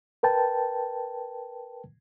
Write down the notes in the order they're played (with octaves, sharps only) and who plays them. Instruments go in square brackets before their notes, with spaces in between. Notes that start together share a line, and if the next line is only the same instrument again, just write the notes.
[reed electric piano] A#4 B4 G5 A5